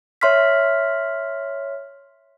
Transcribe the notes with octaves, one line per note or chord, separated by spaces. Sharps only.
C#5 E5 C6 F6 B6